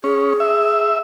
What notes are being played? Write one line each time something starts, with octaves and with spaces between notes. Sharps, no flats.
C#4 G#4
E5